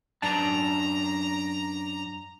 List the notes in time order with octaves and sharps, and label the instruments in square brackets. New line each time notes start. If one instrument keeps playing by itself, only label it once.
[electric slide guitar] F#2 D4 A5 [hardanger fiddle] A#5